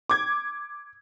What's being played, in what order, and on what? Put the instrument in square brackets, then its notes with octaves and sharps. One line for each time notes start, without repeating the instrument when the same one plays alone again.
[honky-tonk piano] D6 G#6